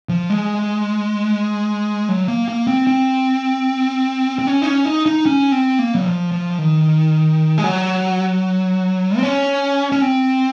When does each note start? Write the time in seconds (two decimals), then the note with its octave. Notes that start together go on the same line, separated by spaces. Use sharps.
0.09 F3
0.30 G#3
2.09 F#3
2.28 A#3
2.48 A#3
2.67 C4
2.87 C4
4.39 C4
4.47 C#4
4.62 D#4
4.66 C#4
4.85 D#4
5.06 D#4
5.26 C#4
5.52 C4
5.79 A#3
5.95 F#3
6.06 F3
6.32 F3
6.51 F3
6.58 D#3
7.58 G#3
7.64 F#3
9.17 C4
9.23 C#4
9.92 C#4
10.01 C4